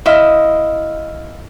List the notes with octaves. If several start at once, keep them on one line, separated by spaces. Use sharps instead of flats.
E4 D#5 F5 C6